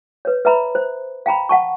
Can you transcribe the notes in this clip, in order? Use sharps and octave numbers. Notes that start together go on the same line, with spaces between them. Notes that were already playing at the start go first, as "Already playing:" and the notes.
B4 C#5
B4 E5 A#5 B5
C5
F5 G5 A#5 B5
F#5 A5 C#6